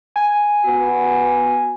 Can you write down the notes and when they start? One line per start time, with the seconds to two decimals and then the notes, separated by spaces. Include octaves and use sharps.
0.16 G#5
0.65 B3 F#4